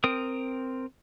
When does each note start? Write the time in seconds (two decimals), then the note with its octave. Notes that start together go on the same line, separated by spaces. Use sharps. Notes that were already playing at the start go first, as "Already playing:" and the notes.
0.04 C4 A#4 D#6